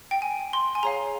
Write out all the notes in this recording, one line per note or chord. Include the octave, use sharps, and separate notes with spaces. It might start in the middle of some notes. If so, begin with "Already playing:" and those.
G5
G#5
C6
G#5
G#4 C#5 F5 A#5